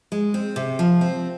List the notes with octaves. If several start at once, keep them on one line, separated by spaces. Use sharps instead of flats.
G#3
C4
C3
F3
C4